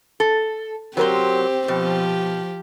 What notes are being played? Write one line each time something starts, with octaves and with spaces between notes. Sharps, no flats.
A4
F#3 C4 G4 A#4 C5
B2 F3 G4